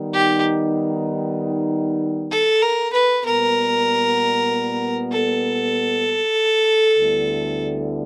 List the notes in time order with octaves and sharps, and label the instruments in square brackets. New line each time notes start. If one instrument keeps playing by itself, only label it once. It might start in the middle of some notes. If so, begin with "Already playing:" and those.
Already playing: [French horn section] D#3 G3 B3 D#4
[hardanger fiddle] G4
A4
A#4
B4
[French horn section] A#2 G3 B3 [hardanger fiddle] A#4
[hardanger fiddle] A4
[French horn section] D2 D3 G3 B3 E4